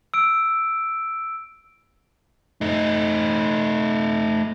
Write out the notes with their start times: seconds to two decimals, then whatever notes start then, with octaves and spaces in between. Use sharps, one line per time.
0.14 E6 D7
2.61 A3 D#4